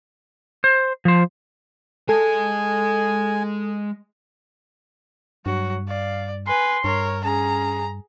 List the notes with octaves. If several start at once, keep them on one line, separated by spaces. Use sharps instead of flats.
C5
F3 C5
G#3 A4 D#5 G#5
G2 F#3 F#4
D5 F5
B4 G#5 C6
G2 A#4 C#5
C#4 G#4 A#5